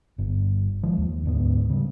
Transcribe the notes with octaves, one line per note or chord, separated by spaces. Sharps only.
G1 G2
D#3 F3 G#3
D#2
D2 G#2 B3
C#3 G3